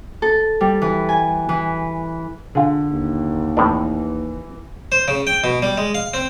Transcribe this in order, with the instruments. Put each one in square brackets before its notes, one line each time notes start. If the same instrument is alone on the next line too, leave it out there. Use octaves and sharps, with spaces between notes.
[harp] A4
G3
E3
G#5
E3
[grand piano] D3 [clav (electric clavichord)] F4 G#4
[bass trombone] D#2
[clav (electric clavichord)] A2 C3 D4 [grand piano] E3
[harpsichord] C5
C#3
G5
B2
G3
G#3
F5
C4